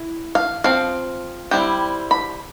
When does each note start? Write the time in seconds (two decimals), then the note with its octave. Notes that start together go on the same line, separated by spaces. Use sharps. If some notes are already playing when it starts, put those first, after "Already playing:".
Already playing: E4
0.35 F5
0.64 F3 C4 F5
1.51 G3 C4 E4 G5
2.11 B5